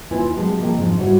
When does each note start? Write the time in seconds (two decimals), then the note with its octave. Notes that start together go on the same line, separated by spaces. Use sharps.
0.11 D#2 E4 F4 B4 C#5 G#5
0.36 C3 F#3 G#3 G4 A5
0.59 C#3 F3 A#3 A4 D#5 G5
0.77 F2 G#2 C#3 F3
0.97 G#2 G3 E4 F#4 C#5